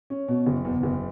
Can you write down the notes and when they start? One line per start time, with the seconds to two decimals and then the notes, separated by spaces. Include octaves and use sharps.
0.10 C#4
0.28 B2
0.46 F#1
0.65 E2
0.83 F#1